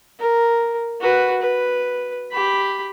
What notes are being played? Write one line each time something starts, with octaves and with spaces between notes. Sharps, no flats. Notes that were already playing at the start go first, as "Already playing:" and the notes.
A#4
F#4 B4
B4
G4 B5